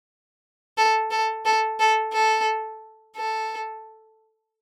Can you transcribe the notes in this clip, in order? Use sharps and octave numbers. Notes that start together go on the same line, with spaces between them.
A4
A4
A4
A4
A4
A4